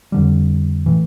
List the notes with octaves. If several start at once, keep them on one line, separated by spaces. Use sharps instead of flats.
F2 D3 G3
A2 E3